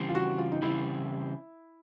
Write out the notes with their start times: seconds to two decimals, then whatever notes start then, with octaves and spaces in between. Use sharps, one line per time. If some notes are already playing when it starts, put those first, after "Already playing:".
Already playing: C#3 E3 G3 C4
0.09 F4
0.15 F#4
0.38 F4
0.52 D#4
0.62 C#3 E3 G3 C4 E4